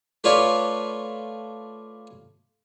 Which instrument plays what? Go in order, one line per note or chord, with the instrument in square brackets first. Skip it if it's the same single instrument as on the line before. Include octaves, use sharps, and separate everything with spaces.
[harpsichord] A3 F4 B4 C#5 D5